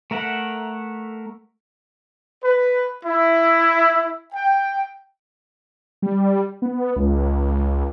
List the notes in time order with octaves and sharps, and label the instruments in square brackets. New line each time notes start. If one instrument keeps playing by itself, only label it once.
[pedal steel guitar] A3 A#4 E5 F#5
[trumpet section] B4
E4
G5
[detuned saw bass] G3
B3
C#2